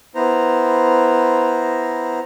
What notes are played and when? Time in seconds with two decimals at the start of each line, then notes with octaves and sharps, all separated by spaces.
0.15 B3 E4 C5 A#5